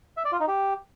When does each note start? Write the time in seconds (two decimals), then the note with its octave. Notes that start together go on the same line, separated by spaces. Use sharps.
0.17 E5
0.25 D5
0.33 F4
0.40 D#4
0.48 G4